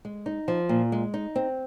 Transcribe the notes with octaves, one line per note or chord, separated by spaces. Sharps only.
G#3
D#4
F3
A#2
G#3
D#4
C4